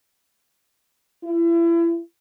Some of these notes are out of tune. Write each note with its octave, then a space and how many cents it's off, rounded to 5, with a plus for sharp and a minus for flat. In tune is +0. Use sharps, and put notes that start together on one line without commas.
E4 +35